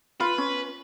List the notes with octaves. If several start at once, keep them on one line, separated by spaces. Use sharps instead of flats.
F4 B4
C#4